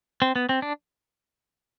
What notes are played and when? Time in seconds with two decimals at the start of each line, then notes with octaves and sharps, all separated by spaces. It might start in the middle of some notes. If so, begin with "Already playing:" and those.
0.22 C4
0.36 B3
0.49 C4
0.62 D4